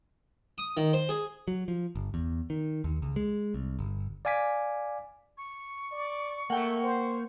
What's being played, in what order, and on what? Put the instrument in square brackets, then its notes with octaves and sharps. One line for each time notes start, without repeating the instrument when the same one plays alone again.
[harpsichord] D#6
D#3
C5
G#4
[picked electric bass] F#3
F3
G1
E2
D#3
D#2
C#2
G#3
C2
G1
[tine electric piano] D5 F5 G#5 D6 B6
[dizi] C#6
[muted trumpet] D5
[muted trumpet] A3 [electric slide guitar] A#3 [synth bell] F#5 G5
[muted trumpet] C5